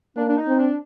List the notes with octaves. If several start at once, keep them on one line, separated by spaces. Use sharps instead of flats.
A#3 D4
D4
D#4
C4
D4